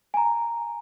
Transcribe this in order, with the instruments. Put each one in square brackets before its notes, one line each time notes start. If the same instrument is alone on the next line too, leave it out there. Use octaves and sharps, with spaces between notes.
[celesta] G#5 A#5